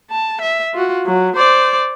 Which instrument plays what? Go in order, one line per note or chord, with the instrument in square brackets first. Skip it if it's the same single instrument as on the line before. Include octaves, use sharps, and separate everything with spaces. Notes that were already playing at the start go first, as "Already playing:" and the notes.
[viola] A5
E5
F4 F#4
F#3
C5 D5